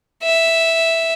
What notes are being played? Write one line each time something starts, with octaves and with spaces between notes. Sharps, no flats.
E5